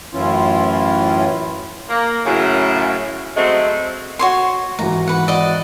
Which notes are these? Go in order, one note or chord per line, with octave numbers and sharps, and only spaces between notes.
F#2 A2 E3 C#4 E4 F4
A#3
F#2 A2 C#3
F#3 G#3 A3 C4
F#4 C#5 C6
G#1 E3 F#4 A#5
B4 F#5
D5 D#5 F#5